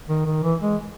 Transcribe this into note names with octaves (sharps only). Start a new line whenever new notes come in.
D#3
D#3
E3
G#3